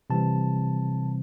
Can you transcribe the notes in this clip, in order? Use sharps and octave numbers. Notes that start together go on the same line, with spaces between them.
C3 E3 G3 C4 A5